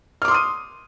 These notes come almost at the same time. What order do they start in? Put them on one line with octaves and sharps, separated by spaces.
F6 D6 C6 D#6 D#7